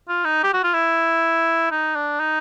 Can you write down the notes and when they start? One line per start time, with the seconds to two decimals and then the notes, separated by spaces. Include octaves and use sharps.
0.09 F4
0.25 D#4
0.43 G4
0.53 F#4
0.63 F4
0.74 E4
1.71 D#4
1.96 D4
2.20 D#4